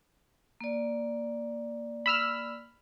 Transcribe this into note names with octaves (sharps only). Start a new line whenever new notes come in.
A#3 D5
B5 E6 F6